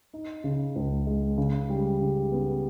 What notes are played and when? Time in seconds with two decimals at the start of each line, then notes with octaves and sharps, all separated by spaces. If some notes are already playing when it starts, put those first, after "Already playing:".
0.13 D#4
0.44 C#3
0.76 C#2
1.07 G#3
1.38 C#3
1.69 G3
2.01 C#3
2.32 B3